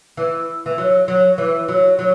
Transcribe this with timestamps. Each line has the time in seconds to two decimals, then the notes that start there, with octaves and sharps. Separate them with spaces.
0.17 E3
0.66 E3
0.78 F#3
1.08 F#3
1.38 E3
1.68 F#3
1.99 F#3